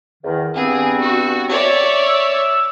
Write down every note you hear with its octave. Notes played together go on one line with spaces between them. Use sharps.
E2 D#3
G2 B3 C4 G#4
F#4
C#5 D5 E5
E6